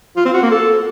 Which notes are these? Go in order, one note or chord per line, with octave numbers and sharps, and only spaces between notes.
F4
C4
F#4
A#3
A4